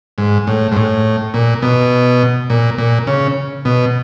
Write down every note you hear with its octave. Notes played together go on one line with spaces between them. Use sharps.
G#2
A2
G#2
A2
A#2
B2
A#2
A#2
C#3
B2